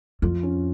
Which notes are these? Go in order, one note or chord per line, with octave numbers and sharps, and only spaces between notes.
F2 F4
C#4